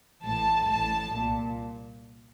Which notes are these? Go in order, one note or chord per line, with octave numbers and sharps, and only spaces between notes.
A1 A2 A5
A1 A2 A5
C2 A#2